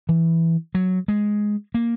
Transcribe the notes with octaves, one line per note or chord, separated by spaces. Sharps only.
E3
F#3
G#3
A#3